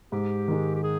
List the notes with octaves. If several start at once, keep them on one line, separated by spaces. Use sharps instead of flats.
G#2 G4
D#3 G#3
G4
G#4